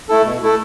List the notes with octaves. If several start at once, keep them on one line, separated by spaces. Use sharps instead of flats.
A3 E4 A4
B2
A3 E4 A4